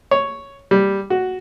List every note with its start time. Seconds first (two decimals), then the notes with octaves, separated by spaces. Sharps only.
0.11 C#5
0.71 G3
1.10 F#4